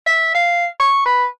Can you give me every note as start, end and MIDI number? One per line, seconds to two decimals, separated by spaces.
0.07 0.33 76
0.35 0.66 77
0.80 1.04 85
1.06 1.26 71